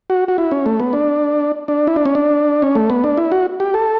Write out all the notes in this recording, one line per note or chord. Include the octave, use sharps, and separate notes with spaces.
F#4
F#4
E4
C#4
A3
B3
D4
D4
E4
D4
C#4
D4
C#4
A3
B3
D4
E4
F#4
G4
A4